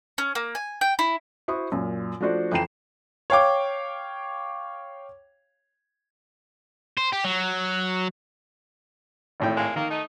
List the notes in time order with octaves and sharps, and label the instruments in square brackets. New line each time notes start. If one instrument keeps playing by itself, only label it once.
[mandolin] C#4
A#3
G#5
G5
E4
[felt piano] E4 F#4 C5 C#6 D#6
F#2 A#2
F3 A3 D4 F#4 C5 D5
F2 E3 G5 A#5 C7 E7
[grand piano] C#5 F5 G5 D6
[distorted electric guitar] C5
G4
F#3
[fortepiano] G#1 A2 G5
[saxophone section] G#3 A#3
[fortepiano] D#3 [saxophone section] A#3
[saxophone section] A3 D#4